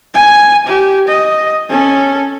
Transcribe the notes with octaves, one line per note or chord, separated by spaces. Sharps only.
G#5
G4
D#5
C#4 A4